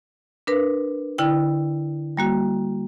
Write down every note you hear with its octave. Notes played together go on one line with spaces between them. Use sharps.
D4 A#4 B4
D3 E4 G5
G3 A#3 F#4